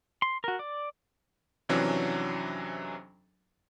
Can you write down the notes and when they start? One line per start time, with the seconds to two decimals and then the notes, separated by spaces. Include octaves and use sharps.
0.22 C6
0.44 F#4 A#4
0.59 D5
1.69 F2 C3 E3 F#3 C#4 D4